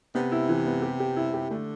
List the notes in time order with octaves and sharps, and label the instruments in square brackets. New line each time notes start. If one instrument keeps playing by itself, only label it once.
[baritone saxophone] C3 [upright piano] B3
[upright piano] E4
E3
B3
G4
G4
E4
G4
[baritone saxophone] D3 [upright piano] A3